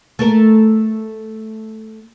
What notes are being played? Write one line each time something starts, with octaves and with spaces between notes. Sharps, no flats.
A3 A#4